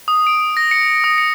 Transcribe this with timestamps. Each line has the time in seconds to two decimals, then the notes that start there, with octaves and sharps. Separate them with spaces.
0.08 D#6
0.27 D7
0.57 A#6
0.71 C#7
1.04 D#6
1.18 C#7